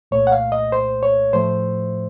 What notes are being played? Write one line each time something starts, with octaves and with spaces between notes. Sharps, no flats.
C2 A#2 A3 C#5
F#5
F5
D#5
C5
C#5
A2 F3 A3 C5